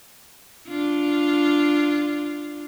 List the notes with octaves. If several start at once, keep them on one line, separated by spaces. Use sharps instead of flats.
D4 F4